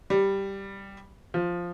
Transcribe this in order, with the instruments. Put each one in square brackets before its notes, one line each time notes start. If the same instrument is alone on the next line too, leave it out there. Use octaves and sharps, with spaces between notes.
[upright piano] G3
F3